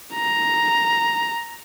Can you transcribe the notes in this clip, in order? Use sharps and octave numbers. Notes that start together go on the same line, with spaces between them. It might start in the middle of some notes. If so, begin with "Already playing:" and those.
A#5